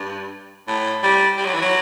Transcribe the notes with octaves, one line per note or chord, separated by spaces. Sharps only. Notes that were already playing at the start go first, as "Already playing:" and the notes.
Already playing: G2
A2
G3
G3
F#3
E3
F#3